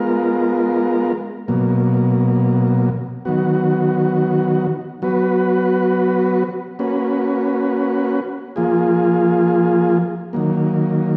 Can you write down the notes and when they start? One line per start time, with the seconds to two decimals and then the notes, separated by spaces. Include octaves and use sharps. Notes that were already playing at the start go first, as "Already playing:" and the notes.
Already playing: G#3 B3 F4 A#4
1.48 B2 F#3 A#3
3.25 D#3 F#3 B3 F#4
5.02 F#3 B3 F#4 B4
6.79 A#3 C#4 F#4 B4
8.56 F3 A#3 F4 G#4
10.33 D#3 F#3 A#3